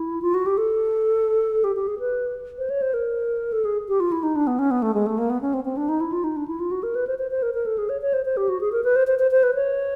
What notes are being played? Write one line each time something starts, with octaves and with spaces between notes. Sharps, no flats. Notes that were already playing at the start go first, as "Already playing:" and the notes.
Already playing: E4
F4
F#4
G4
A4
G4
G4
G#4
B4
C5
C#5
C5
A#4
A4
G#4
G4
F4
E4
D#4
D4
B3
C#4
B3
A3
G#3
A3
A#3
B3
C#4
C4
C4
D4
D#4
E4
F4
D#4
D4
E4
F4
F#4
A#4
B4
C5
C5
C5
A#4
A#4
A4
G#4
C#5
C#5
C5
C5
G4
F#4
G#4
A#4
B4
C5
C5
C5
C5
B4
C#5